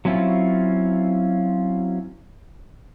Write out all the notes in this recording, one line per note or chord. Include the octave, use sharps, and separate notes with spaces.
F#3 C4 C#4 E4 F4